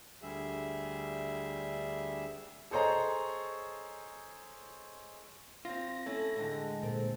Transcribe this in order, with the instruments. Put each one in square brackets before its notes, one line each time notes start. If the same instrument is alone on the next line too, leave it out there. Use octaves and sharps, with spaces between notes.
[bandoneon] D2 D3 G3 G#4 E5
[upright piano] G#4 A4 C5 C#5 D#5 A#5
[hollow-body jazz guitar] C4 F4 [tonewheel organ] A#6
[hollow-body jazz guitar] A3 C#4 E4 [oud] A4
[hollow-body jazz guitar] A2 D3 [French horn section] G#3
[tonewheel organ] A#2 [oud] C4 A4 A#4